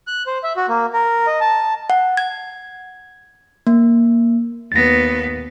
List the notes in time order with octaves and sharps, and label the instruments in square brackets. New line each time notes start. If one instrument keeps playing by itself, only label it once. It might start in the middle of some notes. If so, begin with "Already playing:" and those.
[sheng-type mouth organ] F#6
C5
E5
F#4
A#3
A#4
D#5
A5
[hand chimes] F#5
G#6
A#3
[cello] D#2 B3 [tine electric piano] A6 A#6